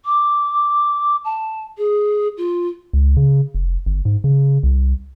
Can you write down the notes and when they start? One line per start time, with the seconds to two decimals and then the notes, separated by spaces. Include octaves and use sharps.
0.05 D6
1.25 A5
1.78 G#4
2.37 F4
2.93 C#2
3.17 C#3
3.54 F1
3.86 G1
4.05 G#2
4.24 C#3
4.63 C2